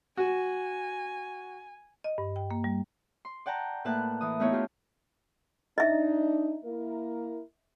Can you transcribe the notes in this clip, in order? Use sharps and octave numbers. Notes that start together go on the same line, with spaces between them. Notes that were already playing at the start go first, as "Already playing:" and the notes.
F#4 G#5
D#5
G2
G5
A#3
G3
C6
D5 F#5 G5 A5 A#5
A2 A#3 B4 A5 F#6
E3 D#6
A3 B3 D#4 E4 C#5 D#5
D4 F4 G4
D4 D#4 D#5 E5
A#3 E4 A#4